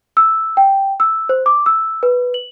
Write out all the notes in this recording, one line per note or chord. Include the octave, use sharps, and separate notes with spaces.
E6
G5
E6
C5
D6
E6
B4
F#7